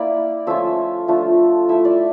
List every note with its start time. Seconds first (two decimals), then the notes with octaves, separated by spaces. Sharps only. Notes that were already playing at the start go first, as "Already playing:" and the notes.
Already playing: A#3 E4 D5
0.47 F3 A3 C#4 F4 E5
1.08 F3 A3 D4 F4
1.69 A3 E4 E5
1.85 D5